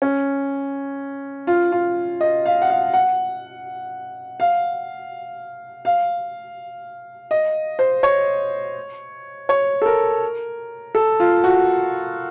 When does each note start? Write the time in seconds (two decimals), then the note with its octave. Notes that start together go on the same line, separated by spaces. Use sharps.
0.02 C#4
1.47 F4
1.72 F4
2.21 D#5
2.46 F5
2.62 F#5
2.70 F5
2.94 F#5
4.40 F5
5.85 F5
7.31 D#5
7.79 C5
8.03 C#5
9.49 C#5
9.82 A4
9.86 A#4
10.95 A4
11.20 F4
11.44 F#4